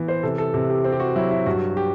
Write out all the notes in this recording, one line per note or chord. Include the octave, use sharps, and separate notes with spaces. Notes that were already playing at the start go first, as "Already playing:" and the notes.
Already playing: E3 B3
C5
C3 A4
A4
C3 A4
G4
C4
G4
F#4
F#3 E4
E4
G2 F#4
G4